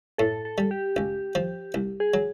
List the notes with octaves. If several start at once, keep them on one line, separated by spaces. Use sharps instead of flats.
A2 A4
A4
G3
G4
C#2
F3
C2
G#4
F#3